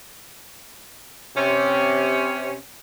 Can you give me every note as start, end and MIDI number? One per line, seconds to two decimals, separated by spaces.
1.36 2.54 48
1.36 2.54 61